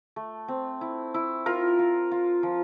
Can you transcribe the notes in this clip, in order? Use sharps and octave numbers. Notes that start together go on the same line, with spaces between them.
A3
C4
E4
E4
F4 A#4
F4
F4
F3